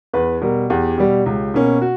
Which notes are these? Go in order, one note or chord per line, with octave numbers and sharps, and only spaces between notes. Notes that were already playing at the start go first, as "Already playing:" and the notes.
E2 B4
B2 G3 A#4
E2 G4
B2 G3
C#2
B2 A#3 C#4
F#4